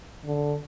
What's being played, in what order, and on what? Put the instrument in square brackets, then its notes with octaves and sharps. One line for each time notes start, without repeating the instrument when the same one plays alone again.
[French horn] D3